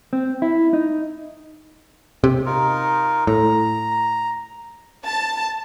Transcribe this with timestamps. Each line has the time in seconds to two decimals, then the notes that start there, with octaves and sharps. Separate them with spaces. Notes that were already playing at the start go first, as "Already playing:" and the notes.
0.13 C4
0.42 E4
0.73 D#4
2.24 C3
2.46 D#4 F4 A#4
3.27 A2 A#5
5.04 A5